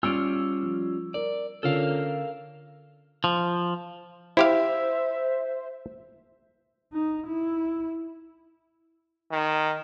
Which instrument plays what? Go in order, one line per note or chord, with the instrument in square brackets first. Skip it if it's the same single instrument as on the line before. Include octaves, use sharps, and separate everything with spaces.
[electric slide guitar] G3 C#4 F4 [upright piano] E6 D7
[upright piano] F3
[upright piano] A#4 [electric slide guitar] D5
[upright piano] D3 C#4 F4 [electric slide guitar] A4 A#4 F5
[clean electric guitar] F3
[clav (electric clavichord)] E4 G4 F5 [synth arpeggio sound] C5 [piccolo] E5
[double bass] D#4
E4
[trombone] D#3